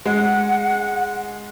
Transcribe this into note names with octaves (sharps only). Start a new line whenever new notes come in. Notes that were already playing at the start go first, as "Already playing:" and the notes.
G#3 F#5